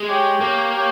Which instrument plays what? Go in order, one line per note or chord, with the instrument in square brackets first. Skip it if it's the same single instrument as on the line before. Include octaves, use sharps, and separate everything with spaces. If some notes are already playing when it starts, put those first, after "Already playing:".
Already playing: [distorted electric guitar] G#3
[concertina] G4 C#5 G5
[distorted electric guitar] A#3 [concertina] G4 C#5 G5
[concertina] G4 C#5 G5